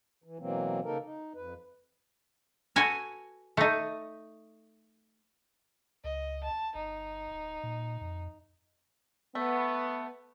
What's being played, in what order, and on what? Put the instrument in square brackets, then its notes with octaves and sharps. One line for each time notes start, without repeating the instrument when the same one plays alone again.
[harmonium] E3
B2 E3 F#3 A#3 C4
C#3 A#3 D#4 A4 A#4
D#4
F2 B4
[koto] F#4 A4 B4 G#5 A#5
A3 D#4
[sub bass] C#2 [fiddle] D#5
[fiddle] A5
[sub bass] G1 [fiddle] D#4
[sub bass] D1
A#2
F2
[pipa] A3 [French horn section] B3